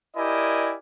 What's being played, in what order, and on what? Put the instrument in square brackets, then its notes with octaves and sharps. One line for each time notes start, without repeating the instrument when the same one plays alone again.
[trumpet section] E4 G4 A#4 D5 D#5 G#5